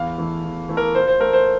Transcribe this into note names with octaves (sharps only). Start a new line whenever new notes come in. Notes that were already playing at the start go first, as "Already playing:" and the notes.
Already playing: E2 F5
E3 A3
E2
E3 A3
A#4
A#2 C5
C5
A3 A#4
C5